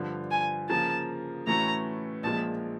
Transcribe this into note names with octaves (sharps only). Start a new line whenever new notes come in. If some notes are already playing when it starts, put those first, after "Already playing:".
Already playing: G2 D3 F3
G#5
C#3 F3 A#3 A5
A2 E3 A3 C#4 F#4 A#5
A#1 A#2 F3 G#3 A5